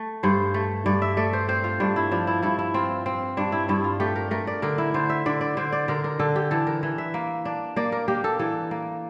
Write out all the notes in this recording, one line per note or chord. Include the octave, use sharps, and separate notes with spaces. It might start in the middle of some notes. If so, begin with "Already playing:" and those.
Already playing: A3
G2 C5
A3
G2 D5
E5
A3 D5
C5
C4 C5
F4
G2 D4
E4
F3 D4
E4
G2 E4
E4
C4 F4
C4
G2 D4
E4
G2 E4
F4
A3 G4
A#4
A3 A#4
D5
D3 A#4
E4
D3 C5
E5
D3 D5
D5
D3 C5
D5
D3 A#4
A#4
D3 A4
G4
E3 A4
A#4
E3
E5
A#3
D4
A#3 D5
A#4
A#3 G4
A4
E3 A4
A#3